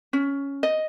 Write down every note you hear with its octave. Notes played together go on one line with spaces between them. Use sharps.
C#4
D#5